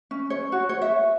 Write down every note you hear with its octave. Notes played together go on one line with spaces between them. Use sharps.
C#4
C#5
F#4
C#5
E5